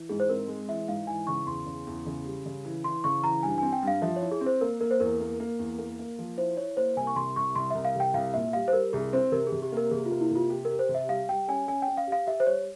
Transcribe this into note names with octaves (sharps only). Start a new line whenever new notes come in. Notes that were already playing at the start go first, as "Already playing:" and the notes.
Already playing: E3
G#2 G#4
C5
C4 A#4
G#3
E3 E5
G#2 F5
E3 G#5
C#3 C#6
E2 C6
C#3
E2
C#3
G3
C#3
E3
E3 C6
C#3 C#6
E3 A#5
G2 G#5
C4 G#5
G5
G2
F5
F3 E5
C#5
E4
G#4
C4
C5
A#3 A#4
A#3 A#4
C5
E2 A#4
A#3
A#3
E2
A#3
A#3
F3
E4 C5
E4 C#5
A#3 C5
C2 G#5
C#6
C3 C6
C2 C#6
C2 C6
C2 E5
F5
C3 G5
C2 F5
A#2 E5
G3 F5
C5
G3 A#4
C2 G#4
C4 C5
C3 A#4
G#4
C3
G4
A#3 A#4
C3 G#4
F4
A#3
E4
C3 F4
G4
A#4
G4
C5
C3
E5
G3 F5
G3 G5
C#4 G#5
C#4 G#5
G5
C#4
F5
G4
F5
G4 E5
C5
G3 C#5